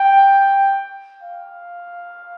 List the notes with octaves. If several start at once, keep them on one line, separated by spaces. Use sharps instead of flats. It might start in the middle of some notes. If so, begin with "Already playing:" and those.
Already playing: G5
F5